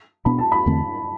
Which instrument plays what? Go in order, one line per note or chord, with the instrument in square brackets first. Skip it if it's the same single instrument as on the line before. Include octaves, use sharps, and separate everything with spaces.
[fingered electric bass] B2 B3 D4 [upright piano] B5
[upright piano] A5
B5
[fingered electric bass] E2 D3 A3 C4